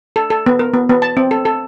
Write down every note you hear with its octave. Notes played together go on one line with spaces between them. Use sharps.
A4
A4
B3
A#4
B3
B3
A5
C4
A4
A4